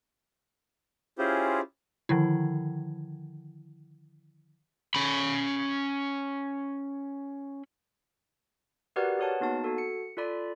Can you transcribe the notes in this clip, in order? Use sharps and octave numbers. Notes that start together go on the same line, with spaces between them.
C#4 E4 F4 G4 G#4 C5
D3 D#3 F3 E4
C#4 B5
F#4 G4 A#4 B4 D5 F#5
G#4 B4 C#5 F#5 A5
A#3 B3 D#4 F#4 A5
F#4 A4
C#7
F4 A4 D5 B5